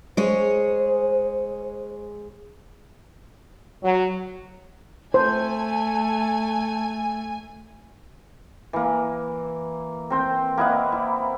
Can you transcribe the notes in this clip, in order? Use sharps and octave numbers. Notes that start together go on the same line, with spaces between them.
G#3 G#4 C5 C#5
F#3
A3 C5 G#5 A5
E3 A#3
C4 C5 G5
A#3 E4 D#5 F#5
E4